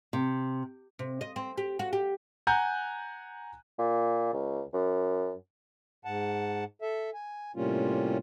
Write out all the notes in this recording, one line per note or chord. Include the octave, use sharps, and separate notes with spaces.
C3
C3
D#5
C4
G4
F#4
G4
F#5 G#5 A#5 F#6 G6
A#2
C#2
F#2
G#2 F#5 A5
A4 E5
G#5
A2 C3 G3 A#3 C#4 F4